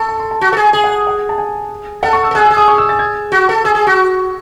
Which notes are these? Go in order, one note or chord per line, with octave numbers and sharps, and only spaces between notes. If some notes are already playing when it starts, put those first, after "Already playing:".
Already playing: A4 C#6
A5
C6
A5
F#4
A4
G#4
G#4 G#5
F#5
F#5
A5
G#5
A4 F#5
C#6
E6
A4
G#4 F#6
E6
G#4
D#6
C#6
E6
A6
G#6
F#4
A4
G#4 E6
G#4
F#4